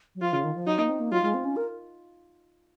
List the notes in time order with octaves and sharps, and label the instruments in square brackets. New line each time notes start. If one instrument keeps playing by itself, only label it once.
[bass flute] F#3
[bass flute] F3 [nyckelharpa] F4
[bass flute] C#3
D#3
F3
[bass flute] F#3 [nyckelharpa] D#4
[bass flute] A#3
C4
A#3
[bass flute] F#3 [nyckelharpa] F4
[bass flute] G#3
C4
C#4
A#4